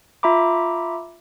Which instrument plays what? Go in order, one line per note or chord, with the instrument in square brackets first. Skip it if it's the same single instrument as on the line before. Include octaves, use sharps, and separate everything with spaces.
[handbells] F4 E5 A#5 B5 D6